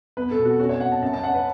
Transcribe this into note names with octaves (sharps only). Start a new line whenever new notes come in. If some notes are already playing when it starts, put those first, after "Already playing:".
B3 B4
A4
B2
F#4
C#4 F#4
C#5
C#4 F#5
A5
F#2 A5
A5
C#4 F#5
B4